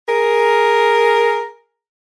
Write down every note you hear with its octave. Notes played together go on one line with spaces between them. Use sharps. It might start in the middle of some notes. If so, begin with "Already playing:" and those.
G#4 A#4